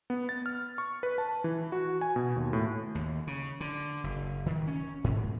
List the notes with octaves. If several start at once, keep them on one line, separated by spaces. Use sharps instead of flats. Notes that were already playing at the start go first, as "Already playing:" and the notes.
B3
A6
F6
C#6
B4
A5
E3
F#4
G#5
B2
D#2
A2
D#2
C#3
D3
F#1
D#3
C#4
G#2